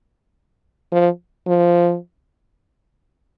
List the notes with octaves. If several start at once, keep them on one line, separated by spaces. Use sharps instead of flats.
F3
F3